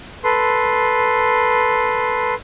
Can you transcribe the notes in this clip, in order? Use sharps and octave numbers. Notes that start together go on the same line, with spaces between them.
A4 B4 C6